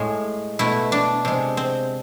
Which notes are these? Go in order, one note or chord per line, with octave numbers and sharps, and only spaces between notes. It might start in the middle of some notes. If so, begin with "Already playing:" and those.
Already playing: A2 G#3
B2 A3 E4
D4
C3 G#3
C4